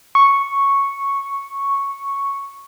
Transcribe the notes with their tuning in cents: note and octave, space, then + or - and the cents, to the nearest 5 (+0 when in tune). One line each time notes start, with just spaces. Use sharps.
C#6 -5